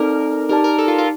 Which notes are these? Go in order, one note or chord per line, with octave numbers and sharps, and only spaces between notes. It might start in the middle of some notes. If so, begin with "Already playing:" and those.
Already playing: C4 D#4 A4 A#4 D5
D#4 G4 A#4 D5 A5
A#4
A4
F4
F4